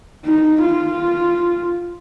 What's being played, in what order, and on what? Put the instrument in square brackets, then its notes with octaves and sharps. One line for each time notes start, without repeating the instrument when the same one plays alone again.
[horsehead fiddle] D#4
F4